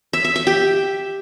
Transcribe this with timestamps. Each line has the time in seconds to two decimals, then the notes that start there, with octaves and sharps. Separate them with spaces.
0.13 E5
0.24 E5
0.36 E5
0.47 G4